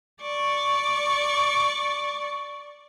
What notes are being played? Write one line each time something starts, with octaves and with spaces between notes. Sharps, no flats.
D5 C#6